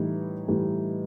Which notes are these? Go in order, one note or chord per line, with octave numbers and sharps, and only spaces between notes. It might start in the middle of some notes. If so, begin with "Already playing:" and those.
Already playing: A2 E3 G3 D#4
A2 E3 G3